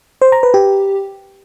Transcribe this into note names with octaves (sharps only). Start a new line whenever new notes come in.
C5
A#5
B4
G4